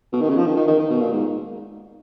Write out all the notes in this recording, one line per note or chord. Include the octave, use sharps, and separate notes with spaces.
B2
D#3
C#3
F3
D#3
D#3
D#3
D#3
B2
A#2
G#2